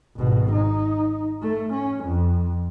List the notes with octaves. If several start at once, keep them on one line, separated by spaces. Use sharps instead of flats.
G#1 B2
D#4
A3
C#4
F2